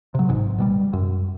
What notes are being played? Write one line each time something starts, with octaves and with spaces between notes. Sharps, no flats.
C3 F#3
G#1 G#2
B2 F#3 G3
F#2